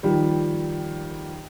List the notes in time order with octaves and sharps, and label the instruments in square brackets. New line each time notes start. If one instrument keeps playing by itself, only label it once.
[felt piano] D#3 F3 G3